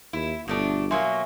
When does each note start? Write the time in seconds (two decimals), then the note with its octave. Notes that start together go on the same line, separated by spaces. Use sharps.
0.13 D#2 E4
0.48 G1 B2 A3 D4
0.91 B2 F#3 A#3 E5 G#5 C6